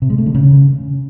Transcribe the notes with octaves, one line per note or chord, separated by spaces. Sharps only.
C3
G#3
A3
D3
C#3